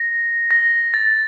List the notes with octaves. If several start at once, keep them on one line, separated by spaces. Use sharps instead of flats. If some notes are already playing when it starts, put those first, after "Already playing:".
Already playing: A#6
A#6
A6